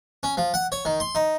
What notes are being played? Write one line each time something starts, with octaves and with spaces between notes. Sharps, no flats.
C#4
F3
F#5
C#5
D#3
C6
D#4